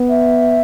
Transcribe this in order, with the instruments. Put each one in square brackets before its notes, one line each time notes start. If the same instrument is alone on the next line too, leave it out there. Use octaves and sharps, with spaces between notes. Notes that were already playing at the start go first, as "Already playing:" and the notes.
Already playing: [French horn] B3
[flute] E5